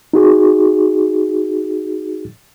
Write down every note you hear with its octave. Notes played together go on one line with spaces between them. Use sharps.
D#4 F#4 G#4